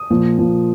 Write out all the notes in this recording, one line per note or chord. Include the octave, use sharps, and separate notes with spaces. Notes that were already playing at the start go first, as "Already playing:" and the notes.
Already playing: D#6
A#2 F3
A#2 F3